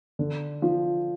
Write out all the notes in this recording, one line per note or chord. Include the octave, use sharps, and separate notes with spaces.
D3
F3